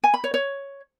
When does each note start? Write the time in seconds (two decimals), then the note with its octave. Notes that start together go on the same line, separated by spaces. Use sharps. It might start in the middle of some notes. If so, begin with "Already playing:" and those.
0.04 G#5
0.14 B5
0.24 C#5
0.34 C#5